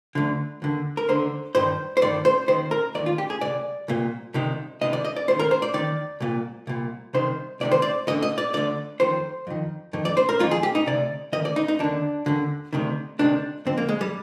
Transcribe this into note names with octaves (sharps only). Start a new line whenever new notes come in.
D2 D3
D#2 D3
A#4
D#2 D3 C5
G2 D#3 C5
C5
G2 D#3 D5
C5
D#2 D#3 C5
A#4
D#2 D#3 D5
F4
G4
G#4
C2 A#2 D5
C2 A#2
C2 C3 D#3
C2 C3 D#3 D#5
D5
D#5
D5
D#2 D#3 C5
A#4
C5
D5
D#2 D#3 D5
C2 A#2
C2 A#2
C2 C3 D#3 C5
C2 C3 D#3 D5
C5
D5
D2 D3 D#5
D#5
D5
D2 D3 D5
F2 D#3 C5
F2 D#3
F2 D#3
D5
C5
A#4
F2 D#3 F4
G#4
G4
D#4
D2 C3 D5
D2 C3 D#3 D#5
D5
D#4
D#4
D#2 D3 D4
D#2 D3
D2 C3 D#3
D2 C3 D#3 D4
F2 D3 C4
A#3
G#3
G3